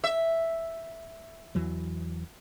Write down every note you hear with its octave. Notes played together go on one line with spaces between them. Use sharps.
E5
E2 E3 F#3